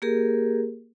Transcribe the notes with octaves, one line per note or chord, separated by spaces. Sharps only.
A#3 G4 G#4 A#4